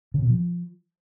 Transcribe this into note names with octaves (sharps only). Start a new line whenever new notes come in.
C#3
B2
F3